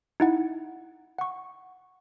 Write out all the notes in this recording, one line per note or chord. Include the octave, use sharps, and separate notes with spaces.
D#4 E4 F#5
F#5 C#6